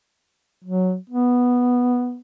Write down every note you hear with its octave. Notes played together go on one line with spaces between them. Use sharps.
F#3
B3